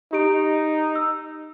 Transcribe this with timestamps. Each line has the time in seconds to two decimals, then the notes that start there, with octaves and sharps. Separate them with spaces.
0.13 D#4 G4 D7
0.95 E6